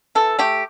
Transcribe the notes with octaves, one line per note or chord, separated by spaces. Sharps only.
E3 A4
A3 G4